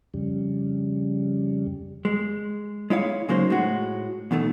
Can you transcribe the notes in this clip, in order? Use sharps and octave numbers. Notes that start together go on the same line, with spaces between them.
F2 C#3 G3
G#3
G#3 E4 C#5 F5
C#3 F#3 G#3 A#3 D#4 C5
A2 G#3 F#4
E2 B2 D#3 A3